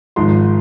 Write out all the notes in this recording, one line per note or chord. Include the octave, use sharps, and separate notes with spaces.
G#1 G#2 F3 C6